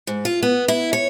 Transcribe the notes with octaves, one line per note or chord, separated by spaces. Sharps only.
G#2
F4
B3
E4
C#5